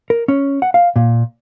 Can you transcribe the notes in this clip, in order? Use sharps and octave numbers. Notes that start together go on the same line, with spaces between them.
A#4
C#4
F#5
F5
A#2